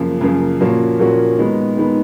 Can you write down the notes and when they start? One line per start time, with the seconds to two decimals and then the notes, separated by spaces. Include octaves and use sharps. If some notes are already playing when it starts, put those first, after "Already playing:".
Already playing: F#2 C#3 F3 A#3
0.21 F#2 C#3 F3 A#3
0.61 A#2 F3 A#3 C#4 F#4
0.99 A#2 F3 A#3 C#4 F#4
1.37 D#3 G#3 B3 D#4
1.77 D#3 G#3 B3 D#4